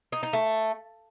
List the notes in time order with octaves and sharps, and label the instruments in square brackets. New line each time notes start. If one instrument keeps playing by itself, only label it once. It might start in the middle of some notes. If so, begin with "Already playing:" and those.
[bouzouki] D#4
D#4
A3